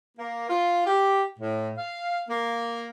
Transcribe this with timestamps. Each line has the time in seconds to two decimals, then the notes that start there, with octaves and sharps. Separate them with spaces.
0.18 A#3
0.49 F4
0.86 G4
1.38 A2
1.78 F5
2.29 A#3